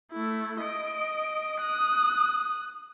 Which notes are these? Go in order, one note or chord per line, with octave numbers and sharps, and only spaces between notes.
A3 E4
D#5 D7
D#6 F#6